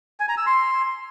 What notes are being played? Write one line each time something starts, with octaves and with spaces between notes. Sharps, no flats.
G#5
A#5
E6
C6